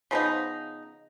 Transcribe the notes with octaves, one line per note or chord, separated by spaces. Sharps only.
C#3 F3 B3 D#4